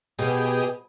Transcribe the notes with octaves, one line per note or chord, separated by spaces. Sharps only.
B2 G4 G#4 D#5